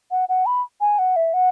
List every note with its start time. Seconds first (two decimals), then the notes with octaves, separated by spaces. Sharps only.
0.11 F#5
0.29 F#5
0.46 B5
0.81 G#5
0.99 F#5
1.16 E5
1.34 F#5